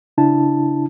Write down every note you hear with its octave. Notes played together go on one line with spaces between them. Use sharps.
C#3 D4 E4 A5